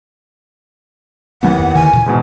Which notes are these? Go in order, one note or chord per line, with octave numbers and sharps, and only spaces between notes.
D#2 E3 F#3 A3 C4 F#5
E2
D3 D#3 G#5
A#2 C#3 E3
E2 G#2 B2